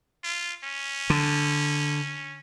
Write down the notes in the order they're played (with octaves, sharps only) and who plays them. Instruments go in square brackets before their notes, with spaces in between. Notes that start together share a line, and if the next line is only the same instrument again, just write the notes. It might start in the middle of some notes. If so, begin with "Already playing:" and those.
[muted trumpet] F4
C#4
[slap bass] D3